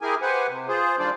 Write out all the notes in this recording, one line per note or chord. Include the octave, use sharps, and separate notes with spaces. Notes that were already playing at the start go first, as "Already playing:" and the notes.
E4 G4 G#4 A#4 G#5
G4 B4 C5 F#5 G#5
C3
F4 G#4 C5
D#3 G3 D4 F4 C5 D5